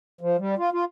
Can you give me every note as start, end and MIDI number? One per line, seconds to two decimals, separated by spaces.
0.21 0.37 53
0.38 0.55 55
0.58 0.70 65
0.73 0.85 65